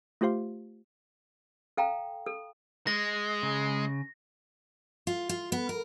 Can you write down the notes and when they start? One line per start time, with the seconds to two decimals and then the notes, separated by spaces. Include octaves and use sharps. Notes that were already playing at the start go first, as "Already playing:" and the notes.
0.21 A3 F4 G4 C5 F5 C6
1.77 A4 F5 G5 A#5
2.26 A4
2.87 G#3 A#6
3.43 C#3
5.07 F4
5.29 F4
5.52 B3
5.69 A#4